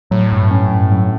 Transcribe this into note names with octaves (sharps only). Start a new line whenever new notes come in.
A2 F#3
G2
C#4
G2
F#3